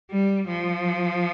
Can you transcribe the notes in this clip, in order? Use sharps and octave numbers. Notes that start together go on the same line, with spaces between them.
G3
F3